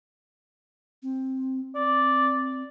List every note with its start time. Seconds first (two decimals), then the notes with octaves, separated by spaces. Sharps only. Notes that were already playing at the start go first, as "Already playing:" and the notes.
1.03 C4
1.75 C4 D5